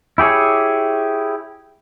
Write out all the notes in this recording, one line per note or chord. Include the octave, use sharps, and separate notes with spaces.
E4 G4 G#4 C#5